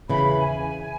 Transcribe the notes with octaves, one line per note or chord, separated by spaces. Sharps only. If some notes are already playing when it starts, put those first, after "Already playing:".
E2 C#3 E3 B5
B5
G#5